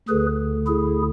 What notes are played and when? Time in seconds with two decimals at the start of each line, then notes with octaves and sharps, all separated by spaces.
0.08 D2 D3 G#4 B4
0.67 E4 G#4